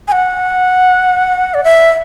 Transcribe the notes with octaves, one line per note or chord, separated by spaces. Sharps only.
G#5
F#5
D5
E5